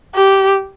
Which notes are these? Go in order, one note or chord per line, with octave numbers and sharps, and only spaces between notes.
G4